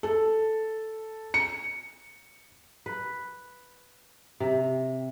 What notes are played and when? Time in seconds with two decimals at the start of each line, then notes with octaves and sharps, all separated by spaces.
0.03 A4
1.34 C#7
2.86 B4
4.40 C3